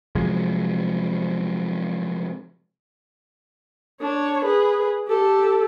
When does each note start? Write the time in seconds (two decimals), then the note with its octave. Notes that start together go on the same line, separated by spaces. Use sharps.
0.15 C3 F3 F#3 G#3
4.01 D4 C#5
4.45 G#4 B4
5.08 G4 A4